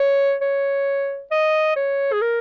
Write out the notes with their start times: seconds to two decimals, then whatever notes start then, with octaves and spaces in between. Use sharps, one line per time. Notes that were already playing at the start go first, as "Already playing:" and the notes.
Already playing: C#5
0.41 C#5
1.31 D#5
1.76 C#5
2.13 G#4
2.21 A#4